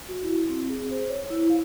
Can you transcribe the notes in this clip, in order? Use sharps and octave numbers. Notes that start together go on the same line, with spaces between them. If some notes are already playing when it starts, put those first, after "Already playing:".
F#4
E4
C4
G#4
C5
C#5
E4
F5